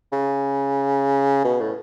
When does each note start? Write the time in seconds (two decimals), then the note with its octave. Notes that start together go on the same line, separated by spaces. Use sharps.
0.12 C#3
1.44 B2
1.61 A2